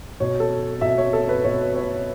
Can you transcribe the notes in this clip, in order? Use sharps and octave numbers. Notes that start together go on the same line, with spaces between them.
B2 C#5
A4
B2 E5
C#5
A4
B4
B2 C#5
C#5